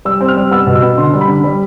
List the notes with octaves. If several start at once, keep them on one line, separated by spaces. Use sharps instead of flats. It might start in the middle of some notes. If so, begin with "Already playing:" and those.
G3 E6
C4
F6
G3
B3 E6
B2
E6
B3
D3 C6
G3
B5
D3
G3